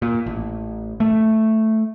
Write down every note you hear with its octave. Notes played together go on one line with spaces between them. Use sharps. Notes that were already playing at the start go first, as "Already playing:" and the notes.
A#2
A1
A3